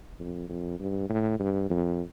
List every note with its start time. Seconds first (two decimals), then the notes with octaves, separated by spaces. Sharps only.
0.20 F2
0.50 F2
0.80 G2
1.10 A2
1.40 G2
1.70 F2